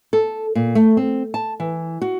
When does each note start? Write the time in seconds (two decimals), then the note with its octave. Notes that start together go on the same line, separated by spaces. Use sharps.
0.13 A4
0.55 A#2
0.75 A3
0.97 C4
1.34 A5
1.60 E3
2.02 F#4